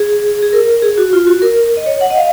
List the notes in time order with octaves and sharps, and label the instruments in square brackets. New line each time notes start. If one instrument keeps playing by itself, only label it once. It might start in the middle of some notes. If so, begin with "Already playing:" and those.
Already playing: [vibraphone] G#4
G#4
A#4
G#4
F#4
F4
F#4
A#4
D#5
C#5
F#5
D#5
F5